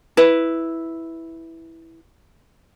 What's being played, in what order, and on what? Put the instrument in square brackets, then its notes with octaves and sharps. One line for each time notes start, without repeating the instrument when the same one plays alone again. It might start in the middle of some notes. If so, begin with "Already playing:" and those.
[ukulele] E4 B4